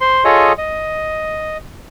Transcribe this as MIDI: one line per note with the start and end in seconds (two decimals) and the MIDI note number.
0.01 0.24 72
0.01 0.24 84
0.25 0.53 65
0.25 0.53 68
0.25 0.53 69
0.25 0.53 73
0.25 0.53 75
0.58 1.57 75